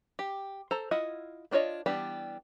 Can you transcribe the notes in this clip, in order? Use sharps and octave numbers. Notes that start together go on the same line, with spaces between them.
G4
A4 C5 A#5
E4 F4 D#5 F#5
B3 D4 F4 C#5 D#5
E3 G3 B3 D4 G4